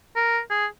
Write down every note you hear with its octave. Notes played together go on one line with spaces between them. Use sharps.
A#4
G#4